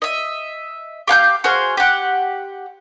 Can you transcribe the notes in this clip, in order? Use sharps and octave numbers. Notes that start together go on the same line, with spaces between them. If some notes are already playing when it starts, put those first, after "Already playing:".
D#5 E5
G4 F5 F#6 G6
F#4 G#4 C5 F5
G4 F#5